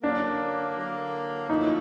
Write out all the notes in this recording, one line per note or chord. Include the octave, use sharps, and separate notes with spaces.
D3 F#3 A#3 D4
D3 F#3 A#3
A#2 F3 A3 C#4 D#4 E4